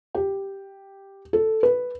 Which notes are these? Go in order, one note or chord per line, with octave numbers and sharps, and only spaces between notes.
G4
A4
B4